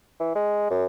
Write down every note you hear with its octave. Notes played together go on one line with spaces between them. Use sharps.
E3
G#3
F#2